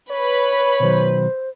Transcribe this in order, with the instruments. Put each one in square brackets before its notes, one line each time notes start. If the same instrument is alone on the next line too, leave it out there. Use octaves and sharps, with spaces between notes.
[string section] B4 B5 [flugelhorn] C#5
[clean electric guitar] B2 D#3 F#3 [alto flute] C5